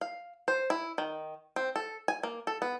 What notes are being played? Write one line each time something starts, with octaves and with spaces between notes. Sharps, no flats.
F5
C5
E4
D#3
C4
A4
G#5
A#3
A4
B3